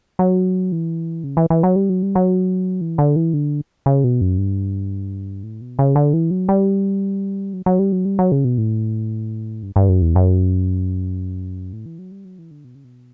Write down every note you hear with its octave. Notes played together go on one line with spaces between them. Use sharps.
F#3
E3
C#3
E3
E3
F#3
G3
F#3
G3
F#3
E3
D3
E3
D3
C#3
B2
F#2
G2
A2
B2
C#3
D3
E3
F#3
G3
F#3
F#3
G3
F#3
G3
F#3
C#3
B2
A2
G2
G2
F#2
E2
F#2
A2
E3
F#3
G3
F#3
E3
D3
B2
C#3
B2